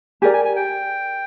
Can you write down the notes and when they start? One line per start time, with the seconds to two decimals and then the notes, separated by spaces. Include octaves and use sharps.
0.22 G4 A#4 D5 G#5
0.33 G#5
0.45 G#5
0.56 G5